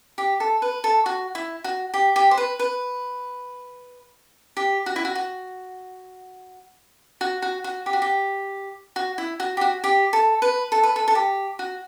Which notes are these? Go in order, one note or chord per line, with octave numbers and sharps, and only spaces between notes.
G4
A4
B4
A4
F#4
E4
F#4
G4
G4
C5
B4
B4
G4
F#4
E4
F#4
F#4
F#4
F#4
F#4
G4
F#4
G4
F#4
E4
F#4
G4
F#4
G4
A4
B4
A4
B4
A4
A4
G4
F#4